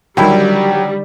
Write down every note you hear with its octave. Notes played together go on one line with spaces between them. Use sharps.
D3 D#3 F#3 G3 E4 G5